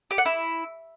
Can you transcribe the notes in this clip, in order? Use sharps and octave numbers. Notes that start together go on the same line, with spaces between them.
G4
F#5
E4